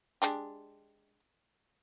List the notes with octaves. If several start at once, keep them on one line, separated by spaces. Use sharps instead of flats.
G#3 D4 G4